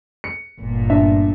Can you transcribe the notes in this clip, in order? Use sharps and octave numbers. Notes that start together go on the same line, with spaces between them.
C#7
G1 A#2
D4 E5